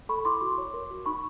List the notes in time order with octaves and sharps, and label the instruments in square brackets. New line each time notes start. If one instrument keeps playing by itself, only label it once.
[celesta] A4 B5 C#6
E4 C6 D6
F#4
C#5
A#4
F#4
D#4 B5 C#6